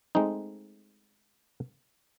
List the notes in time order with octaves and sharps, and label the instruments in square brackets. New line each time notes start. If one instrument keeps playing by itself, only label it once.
[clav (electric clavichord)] G#3 A3 C4 D#4